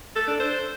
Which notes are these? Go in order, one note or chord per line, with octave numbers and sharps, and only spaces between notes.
A4
D4
C5